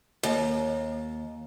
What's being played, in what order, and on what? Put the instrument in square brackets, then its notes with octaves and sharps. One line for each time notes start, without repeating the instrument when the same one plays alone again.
[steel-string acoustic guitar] D#2